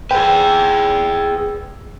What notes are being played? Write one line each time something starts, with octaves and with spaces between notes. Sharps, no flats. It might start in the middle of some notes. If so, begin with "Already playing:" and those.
G#4 B4 G5